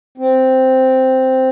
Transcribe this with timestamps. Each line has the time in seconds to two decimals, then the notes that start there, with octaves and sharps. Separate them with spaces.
0.18 C4